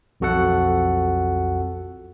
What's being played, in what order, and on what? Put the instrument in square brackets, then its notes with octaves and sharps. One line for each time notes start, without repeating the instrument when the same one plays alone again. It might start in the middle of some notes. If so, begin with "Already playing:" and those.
[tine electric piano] B1 F2 F#4 A4 F#5